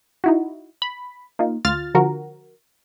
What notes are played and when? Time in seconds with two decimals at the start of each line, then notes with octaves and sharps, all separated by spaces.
0.24 D#4 E4 F#4
0.82 B5
1.39 A#3 D#4 F4
1.65 D2 F4 F6 A6
1.94 D3 F3 F#4 A#4